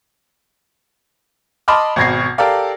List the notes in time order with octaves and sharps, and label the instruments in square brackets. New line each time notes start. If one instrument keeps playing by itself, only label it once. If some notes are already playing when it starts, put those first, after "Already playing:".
[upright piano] D#5 A5 B5 C6 D6 F6
G#1 B2 G#6 A#6 C7
G4 A4 A#4 D5 F5